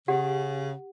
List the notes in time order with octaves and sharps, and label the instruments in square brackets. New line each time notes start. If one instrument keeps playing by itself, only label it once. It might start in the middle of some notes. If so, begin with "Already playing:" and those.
[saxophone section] C#3 [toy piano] G4 F#5